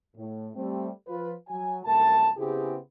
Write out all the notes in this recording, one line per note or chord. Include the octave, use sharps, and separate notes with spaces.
A2
G3 A3 C4
F3 F4 B4
F#3 G#5
C2 F#2 A3 A#4 A5
C#3 B3 C4 E4 G4 G#4